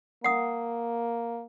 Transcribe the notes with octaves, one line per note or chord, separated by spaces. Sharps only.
A#3 F#5 D#6